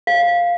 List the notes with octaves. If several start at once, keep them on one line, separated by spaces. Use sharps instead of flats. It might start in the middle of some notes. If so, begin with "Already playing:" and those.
F5